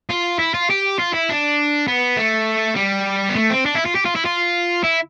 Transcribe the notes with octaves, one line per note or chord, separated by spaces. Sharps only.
F4
E4
F4
G4
F4
E4
D4
B3
A3
G3
B3
A3
C4
D4
E4
F4
G4
F4
E4
F4
E4